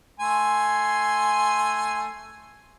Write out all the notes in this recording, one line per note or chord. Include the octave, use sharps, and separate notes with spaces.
A3 G#5 C6